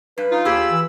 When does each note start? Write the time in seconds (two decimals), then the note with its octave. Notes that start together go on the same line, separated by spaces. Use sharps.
0.18 G2 B4
0.31 D#4 F4
0.45 D#2 G4 G#4 B5 E6
0.70 E3